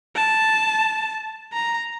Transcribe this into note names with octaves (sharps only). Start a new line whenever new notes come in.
A5
A#5